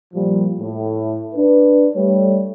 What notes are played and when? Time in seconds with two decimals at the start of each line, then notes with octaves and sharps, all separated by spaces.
0.14 A#2 F3 G3
0.60 A2
1.35 D4 B4
1.95 G3 A3 C#5